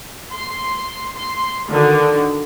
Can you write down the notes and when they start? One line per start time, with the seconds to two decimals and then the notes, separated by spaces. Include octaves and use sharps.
0.32 C6
1.17 C6
1.69 D3 D#3 F#4